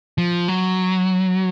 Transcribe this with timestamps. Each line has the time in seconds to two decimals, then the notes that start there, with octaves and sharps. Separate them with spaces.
0.18 F3
0.48 F#3